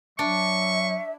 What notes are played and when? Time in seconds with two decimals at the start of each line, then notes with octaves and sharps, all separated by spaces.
0.19 F#3 D4 E5 C#6